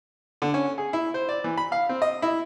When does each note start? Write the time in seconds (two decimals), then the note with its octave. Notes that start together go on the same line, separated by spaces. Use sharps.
0.42 D3
0.54 C#4
0.78 G#4
0.93 E4
1.14 C5
1.29 D5
1.44 E3
1.58 B5
1.72 F5
1.89 C4
2.02 D#5
2.22 E4